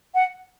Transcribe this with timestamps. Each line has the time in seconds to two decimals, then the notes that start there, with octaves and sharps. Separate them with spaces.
0.14 F#5